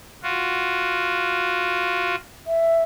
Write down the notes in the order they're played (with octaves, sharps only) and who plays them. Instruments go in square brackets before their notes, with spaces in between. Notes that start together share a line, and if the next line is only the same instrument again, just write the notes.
[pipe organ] F4 F#4
[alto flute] E5